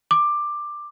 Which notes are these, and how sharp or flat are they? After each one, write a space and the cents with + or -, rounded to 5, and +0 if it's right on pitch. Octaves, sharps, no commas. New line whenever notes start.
D6 +10